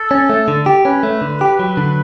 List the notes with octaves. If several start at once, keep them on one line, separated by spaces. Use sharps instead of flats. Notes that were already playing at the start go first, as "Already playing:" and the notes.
Already playing: A4
C#4
A3
D3
G4
C#4 B4
A3
D3
G4
F#3
D3